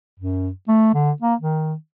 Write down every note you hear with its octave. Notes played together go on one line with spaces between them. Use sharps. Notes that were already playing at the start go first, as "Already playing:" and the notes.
F#2
A3
D3
A#3
D#3